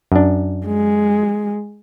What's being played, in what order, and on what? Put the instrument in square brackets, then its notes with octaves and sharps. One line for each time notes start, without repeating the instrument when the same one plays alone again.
[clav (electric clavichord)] F#2 D4
[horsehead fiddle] G#3